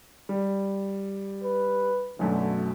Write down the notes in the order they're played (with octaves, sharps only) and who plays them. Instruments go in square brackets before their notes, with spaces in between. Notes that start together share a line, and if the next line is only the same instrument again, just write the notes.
[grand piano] G3
[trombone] B4
[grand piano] B1 F#2 A3 [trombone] D3